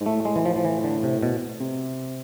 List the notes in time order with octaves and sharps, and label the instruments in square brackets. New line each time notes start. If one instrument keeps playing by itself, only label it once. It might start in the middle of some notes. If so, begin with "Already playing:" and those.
[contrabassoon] G#2
[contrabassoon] A2 [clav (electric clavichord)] A3
[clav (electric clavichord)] G#3
E3
F3
F3
E3
D3
C3
B2
[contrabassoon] C3